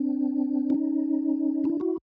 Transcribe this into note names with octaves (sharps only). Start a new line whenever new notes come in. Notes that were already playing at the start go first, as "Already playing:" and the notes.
Already playing: C4 D4
C#4 D#4
D4 E4
E4 F#4